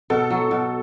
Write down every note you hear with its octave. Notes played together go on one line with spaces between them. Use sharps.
B2 A4
F#3
B2